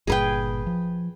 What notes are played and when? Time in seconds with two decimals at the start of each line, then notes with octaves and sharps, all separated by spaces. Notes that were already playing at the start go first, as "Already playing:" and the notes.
0.07 G1 G2 A#2 G#4 B4 G5
0.67 F3